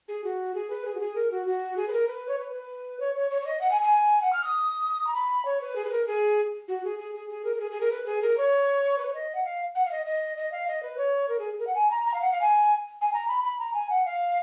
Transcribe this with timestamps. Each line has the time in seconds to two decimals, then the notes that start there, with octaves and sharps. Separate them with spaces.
0.08 G#4
0.24 F#4
0.55 G#4
0.70 B4
0.85 G#4
0.95 F#4
1.00 G#4
1.15 A#4
1.31 F#4
1.46 F#4
1.77 G#4
1.88 B4
1.93 A#4
2.08 B4
2.28 C#5
2.39 B4
2.54 B4
3.00 C#5
3.15 C#5
3.31 C#5
3.41 C#5
3.46 D#5
3.61 F#5
3.71 G#5
3.82 G#5
4.22 F#5
4.33 F6
4.44 D#6
5.07 A#5
5.14 B5
5.45 C#5
5.61 B4
5.76 G#4
5.84 B4
5.92 A#4
6.07 G#4
6.68 F#4
6.84 G#4
6.99 G#4
7.15 G#4
7.29 G#4
7.45 A#4
7.55 A#4
7.60 G#4
7.71 G#4
7.81 A#4
7.91 B4
8.06 G#4
8.22 A#4
8.38 C#5
8.98 B4
9.06 C#5
9.14 D#5
9.35 F#5
9.45 F5
9.75 F#5
9.85 F5
9.91 D#5
10.06 D#5
10.37 D#5
10.52 F5
10.68 D#5
10.83 B4
10.98 C#5
11.29 A#4
11.39 G#4
11.59 A#4
11.67 F#5
11.75 G#5
11.91 A#5
12.06 A#5
12.14 F5
12.22 F#5
12.32 F5
12.41 G#5
13.01 G#5
13.13 A#5
13.28 B5
13.44 B5
13.59 A#5
13.74 G#5
13.90 F#5
14.05 F5